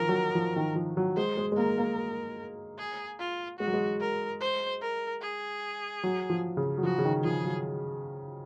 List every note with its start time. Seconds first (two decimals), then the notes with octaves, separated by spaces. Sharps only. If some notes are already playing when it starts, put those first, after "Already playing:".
Already playing: D#3 F3 A#4
0.09 F#3
0.35 F3
0.56 D#3
0.76 F3
0.97 F#3
1.17 G#3 C5
1.38 G#3
1.52 G#3
1.57 A#3 A#4
1.78 A#3
2.78 G#4
3.19 F4
3.59 G#3 F#4
3.68 F#3
3.74 G#3
4.00 A#4
4.41 C5
4.81 A#4
5.22 G#4
6.04 F#3
6.30 F3
6.57 C#3
6.78 F#3
6.83 F3 F#4
6.98 C#3
7.04 D#3
7.24 F3 G#4
7.45 F#3